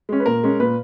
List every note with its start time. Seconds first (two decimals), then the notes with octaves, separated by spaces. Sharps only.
0.09 G#3 C#4
0.20 B4
0.26 A#2 A#4
0.43 G#3 C#4
0.60 A#2 B4